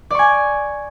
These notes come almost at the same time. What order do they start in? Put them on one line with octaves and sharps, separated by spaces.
D5 C#6 G#5